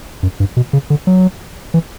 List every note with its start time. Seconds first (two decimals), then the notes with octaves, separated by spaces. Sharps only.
0.23 F#2
0.40 G2
0.57 B2
0.73 C#3
0.90 D3
1.07 F#3
1.74 E3